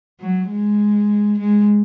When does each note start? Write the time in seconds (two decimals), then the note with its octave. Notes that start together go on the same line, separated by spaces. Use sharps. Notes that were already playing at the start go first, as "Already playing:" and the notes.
0.20 F#3
0.50 G#3
1.38 G#3